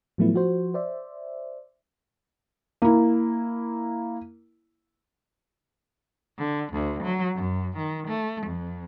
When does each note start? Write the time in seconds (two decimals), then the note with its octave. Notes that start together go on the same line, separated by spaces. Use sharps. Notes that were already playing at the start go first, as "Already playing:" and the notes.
0.18 A2 F3 F#3 A3 B3 E4
0.34 F3 F#4 C5
0.74 C5 D5 E5
2.82 A#3 E4
6.38 D3
6.73 D2
7.04 F#3
7.35 F#2
7.77 D#3
8.07 A3
8.47 F2